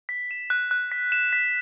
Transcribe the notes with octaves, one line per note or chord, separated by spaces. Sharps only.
B6
E7
F#6
F#6
B6
E7
B6